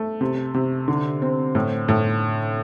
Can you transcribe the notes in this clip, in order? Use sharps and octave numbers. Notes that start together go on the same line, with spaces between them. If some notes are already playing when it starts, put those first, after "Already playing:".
Already playing: A3
C3
C3
D3
C4
A2
A2